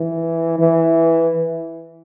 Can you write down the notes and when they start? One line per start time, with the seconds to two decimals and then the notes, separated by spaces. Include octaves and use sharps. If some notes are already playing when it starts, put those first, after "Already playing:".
Already playing: E3
0.59 E3